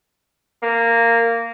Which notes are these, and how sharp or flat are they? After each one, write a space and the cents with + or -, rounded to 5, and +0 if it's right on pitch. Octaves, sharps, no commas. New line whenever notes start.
A#3 -10